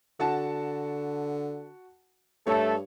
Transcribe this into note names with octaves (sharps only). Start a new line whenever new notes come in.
D3 F#4 F#5 A5
G2 A3 A4 C#5